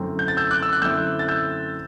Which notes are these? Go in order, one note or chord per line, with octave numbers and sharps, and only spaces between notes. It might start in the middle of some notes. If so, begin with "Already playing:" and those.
Already playing: F#2 D3 A3 C4 E4
G6
A6
E6 G6
D6 F#6
E6
F#6
F#2 D3 A3 C4 E4 E6 G6
A6
E6 G6